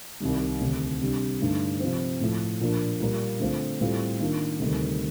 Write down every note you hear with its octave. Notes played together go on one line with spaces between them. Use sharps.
C2 C3 D#3 G3
D2 C3 D#3
C3 G3 D4 G4
G2 D3 A3 D#4
C3 F3 C4
A2 F3 A3
A#2 F3 A#3 D4
A#2 G3 A#3 F4 A#4
D3 A3 C4 F4
A2 G3 C4 F4 A4
D#3 A#3 D4 F4
D2 C3 D#3 G3